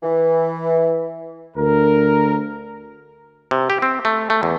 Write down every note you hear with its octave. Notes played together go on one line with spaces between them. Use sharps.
E3
D2 D3 A#4
C3
G4
C4
A3
A3
E2